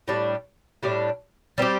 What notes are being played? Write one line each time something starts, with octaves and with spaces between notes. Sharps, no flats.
A2 G3 D4
A2 G3 D4
G3 C4 G4